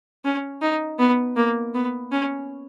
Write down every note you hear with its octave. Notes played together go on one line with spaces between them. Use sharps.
C#4
D#4
B3
A#3
B3
C#4